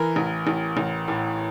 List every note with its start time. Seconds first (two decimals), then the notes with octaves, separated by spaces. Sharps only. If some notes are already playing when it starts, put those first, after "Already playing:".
Already playing: E3 A#4
0.16 A1
0.47 A1
0.77 A1
1.08 A2